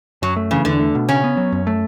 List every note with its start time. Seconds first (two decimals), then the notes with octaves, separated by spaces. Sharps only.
0.22 F#2 F#3
0.36 A3
0.51 C#3 E3
0.65 E2 D3
0.80 A3
0.95 B2
1.09 C#3 C#4
1.24 B3
1.37 F#3
1.52 F#2
1.67 A3